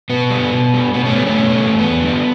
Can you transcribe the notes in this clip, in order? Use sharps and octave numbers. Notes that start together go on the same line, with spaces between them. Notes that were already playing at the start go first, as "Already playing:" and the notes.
B2 B3
G3
B2
G3
B2 B3
A3 C#4
G3 B3
A3 C#4
B2
G3
E2 B3
D3 G3